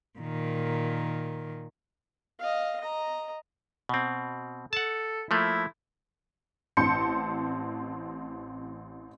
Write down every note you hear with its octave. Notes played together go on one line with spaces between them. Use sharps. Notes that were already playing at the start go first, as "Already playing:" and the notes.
A#2 D#3
D#5 F5
D#5 A#5
B2 C4
A4 F#5 A5
F3 A3 A#3 E4
A1 C4 A5 C6 G6 C#7